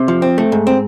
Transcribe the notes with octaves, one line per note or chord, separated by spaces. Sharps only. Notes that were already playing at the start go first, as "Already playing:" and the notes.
Already playing: C3
F3
C4
A3
G#2
C4